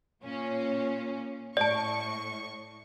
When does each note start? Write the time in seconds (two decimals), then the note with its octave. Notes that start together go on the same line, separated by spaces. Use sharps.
0.23 A#2 C#4
1.57 A2 D5 A5 C#6